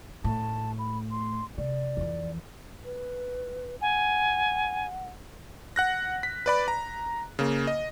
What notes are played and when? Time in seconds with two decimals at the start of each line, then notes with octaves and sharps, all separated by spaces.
0.24 A2 A5
0.79 B5
1.11 C6
1.58 C3 D5
1.97 F2 E3
2.85 B4
3.81 F#5 G#5
5.76 F#5 F#6 A#6
6.23 B6
6.46 B4 D5 B5
6.68 A#5
7.39 C#3 A#3
7.67 D#5